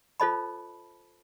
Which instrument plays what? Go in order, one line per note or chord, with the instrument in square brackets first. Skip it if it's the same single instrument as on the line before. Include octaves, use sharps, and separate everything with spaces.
[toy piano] F4 A4 C5 D#5 A5 B5